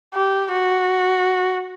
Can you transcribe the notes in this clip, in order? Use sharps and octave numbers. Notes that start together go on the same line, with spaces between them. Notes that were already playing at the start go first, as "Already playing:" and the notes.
G4
F#4